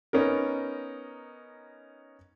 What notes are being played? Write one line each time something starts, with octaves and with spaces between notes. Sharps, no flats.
B3 C#4 D#4 A#4